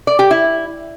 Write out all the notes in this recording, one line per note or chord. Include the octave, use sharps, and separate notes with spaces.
D5
G4
E4